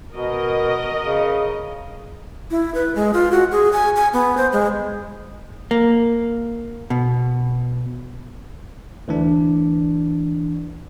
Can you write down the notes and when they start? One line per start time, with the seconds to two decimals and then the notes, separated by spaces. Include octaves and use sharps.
0.14 B2 A#4 D#5
1.03 C#3
2.51 E4
2.75 B4
2.95 G#3
3.13 F4
3.32 F#4
3.52 G#4
3.73 G#5
3.96 G#5
4.13 B3
4.37 C5
4.52 G#3
5.71 A#3
6.90 B2
9.08 D2 E3 D4